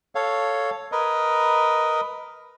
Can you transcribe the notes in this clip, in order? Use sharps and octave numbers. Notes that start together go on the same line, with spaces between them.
A4 C#5 F5
A#4 B4 D#5